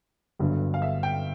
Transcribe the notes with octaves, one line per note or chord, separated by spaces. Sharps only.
G1 G2 D3 F#3
F5
E5
G5